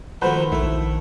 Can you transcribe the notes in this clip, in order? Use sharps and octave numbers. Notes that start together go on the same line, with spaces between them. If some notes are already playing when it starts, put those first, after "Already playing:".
D#3 F3 A3 F#4 B4 C5
A#1 A3 E4